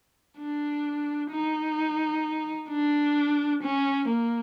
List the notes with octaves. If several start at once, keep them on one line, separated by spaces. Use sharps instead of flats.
D4
D#4
D4
C#4
A#3